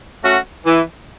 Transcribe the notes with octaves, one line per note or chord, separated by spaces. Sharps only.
A3 C#4 F#4
E3